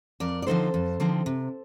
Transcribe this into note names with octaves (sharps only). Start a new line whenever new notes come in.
F2 A#4 D5
D5
D3 F3 C4 D#4 A4 C5
F2
D3 F3 C4 D#4
C3